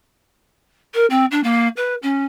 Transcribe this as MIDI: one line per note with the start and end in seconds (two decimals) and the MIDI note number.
0.94 1.06 70
1.10 1.25 60
1.31 1.41 62
1.44 1.68 58
1.77 1.95 71
2.03 2.25 61